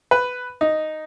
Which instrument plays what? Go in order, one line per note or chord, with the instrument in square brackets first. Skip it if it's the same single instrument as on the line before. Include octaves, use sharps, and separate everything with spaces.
[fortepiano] B4
D#4